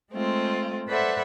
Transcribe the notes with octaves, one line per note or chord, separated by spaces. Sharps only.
G#3 A3 C4 F4
A4 B4 C5 D5 E5 F#5